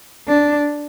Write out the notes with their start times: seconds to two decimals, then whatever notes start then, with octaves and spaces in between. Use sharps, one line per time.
0.28 D4